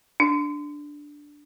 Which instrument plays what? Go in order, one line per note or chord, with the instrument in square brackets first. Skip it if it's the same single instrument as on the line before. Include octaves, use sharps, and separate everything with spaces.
[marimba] D4